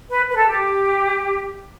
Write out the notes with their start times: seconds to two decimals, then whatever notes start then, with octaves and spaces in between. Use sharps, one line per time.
0.10 B4
0.30 B4
0.36 A4
0.48 G4